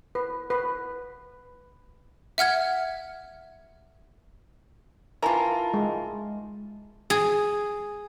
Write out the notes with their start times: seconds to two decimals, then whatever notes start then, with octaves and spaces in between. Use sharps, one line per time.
0.15 B4
0.50 B4
2.38 E5 F#5 F6 G#6
5.23 E3 F4 A#4 A5 A#5
5.74 G#3
7.10 G#4